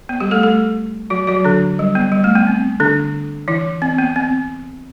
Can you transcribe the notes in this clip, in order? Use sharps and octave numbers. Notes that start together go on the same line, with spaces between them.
B3
G3 G4
A3 A4
A3 A4
F#3 F#4
F#3 F#4
D3 D4
G3
B3
G3
A3
B3
C4
D3 D4
E3 E4
C4
B3
C4